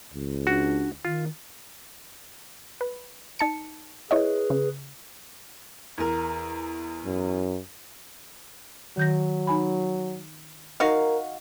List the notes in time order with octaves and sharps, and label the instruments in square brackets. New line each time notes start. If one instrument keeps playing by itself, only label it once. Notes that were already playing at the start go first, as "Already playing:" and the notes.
[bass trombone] C#2
[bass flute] D4 [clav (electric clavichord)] F#4
[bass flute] D#3 [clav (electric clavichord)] F4
[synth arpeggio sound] B4
D#4 A5 C#7
[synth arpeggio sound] E4 C#5 D#5 [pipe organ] G#4 B4
[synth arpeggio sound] C#3
[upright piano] E2 A#4
[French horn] F#2
[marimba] D#3 G6 A#6 [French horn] F#3
[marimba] D#4 G#5 B5
[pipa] D#4 F#4 F5 [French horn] A#4